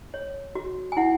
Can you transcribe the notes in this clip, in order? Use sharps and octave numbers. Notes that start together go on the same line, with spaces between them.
C#5
F#4
G#5
E4 F#5